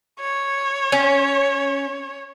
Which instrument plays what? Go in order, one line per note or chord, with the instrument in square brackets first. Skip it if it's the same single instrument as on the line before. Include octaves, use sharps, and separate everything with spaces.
[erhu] C#5
[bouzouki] C#4